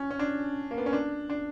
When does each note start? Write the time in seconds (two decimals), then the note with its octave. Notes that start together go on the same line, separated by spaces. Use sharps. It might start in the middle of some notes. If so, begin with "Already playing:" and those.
Already playing: C#4
0.11 C#4
0.19 D4
0.71 A#3
0.78 B3
0.86 C#4
0.93 D4
1.30 D4